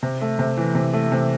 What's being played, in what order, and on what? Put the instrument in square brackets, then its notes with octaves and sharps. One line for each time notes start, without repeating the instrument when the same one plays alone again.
[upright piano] C3
A3
C3
E3
C3
A3
C3